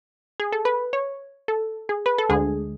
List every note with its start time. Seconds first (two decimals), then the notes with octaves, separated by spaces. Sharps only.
0.40 G#4
0.52 A4
0.65 B4
0.93 C#5
1.48 A4
1.89 G#4
2.06 B4
2.18 A4
2.29 D2 D3 G#3 G#4